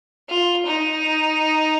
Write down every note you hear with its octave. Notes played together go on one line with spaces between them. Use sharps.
F4
D#4